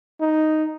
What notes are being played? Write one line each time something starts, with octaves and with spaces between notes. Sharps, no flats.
D#4